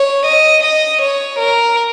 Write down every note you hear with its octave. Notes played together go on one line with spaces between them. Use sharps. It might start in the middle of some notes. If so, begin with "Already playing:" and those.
Already playing: C#5
D#5
D#5
C#5
A#4